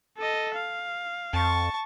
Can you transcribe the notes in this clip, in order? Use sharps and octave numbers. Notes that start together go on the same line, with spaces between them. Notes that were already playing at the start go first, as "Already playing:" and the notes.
A4 D#5
F5
F2 A5 C#6